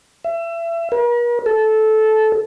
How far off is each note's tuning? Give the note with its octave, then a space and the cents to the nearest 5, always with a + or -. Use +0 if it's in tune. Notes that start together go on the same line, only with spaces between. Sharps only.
E5 +30
A#4 +45
A4 -15